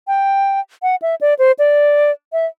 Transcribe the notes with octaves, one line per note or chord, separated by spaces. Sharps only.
G5
F#5
E5
D5
C5
D5
E5